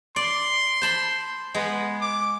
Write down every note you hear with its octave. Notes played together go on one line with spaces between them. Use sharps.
D5 C6
C5 A5 B5
G#3 B3
D6